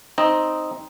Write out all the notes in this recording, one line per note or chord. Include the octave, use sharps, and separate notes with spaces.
C4 D#4 D#5